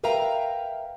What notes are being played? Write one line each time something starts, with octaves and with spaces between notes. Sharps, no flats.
A#4 B4 E5 F5 G5 A#5